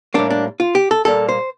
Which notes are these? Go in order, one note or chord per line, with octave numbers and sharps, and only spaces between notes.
A2 G3 A#3 D4
D4
F4
G4
A4
A#2 G3 A#3 A4
C5